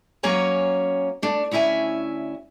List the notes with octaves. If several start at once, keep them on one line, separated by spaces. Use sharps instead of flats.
F#3 A#3 C#4 C#5 G#5 A#5
A3 D4
D2 C#4 E4 E5 G#5